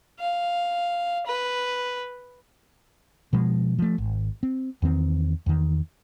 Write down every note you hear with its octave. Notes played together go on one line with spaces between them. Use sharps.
F5
B4
B2 F3 G#3
F3 A3
G#1
C4
E2 D#3 C4
E2 D#3